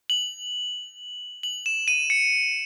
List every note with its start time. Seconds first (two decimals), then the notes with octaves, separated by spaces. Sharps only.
0.10 F#7
1.43 F#7
1.66 E7
1.88 D#7
2.10 C#7